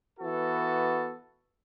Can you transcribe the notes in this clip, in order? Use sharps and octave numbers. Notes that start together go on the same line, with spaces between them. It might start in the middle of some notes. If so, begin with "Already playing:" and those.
E3 B3 F#4 A4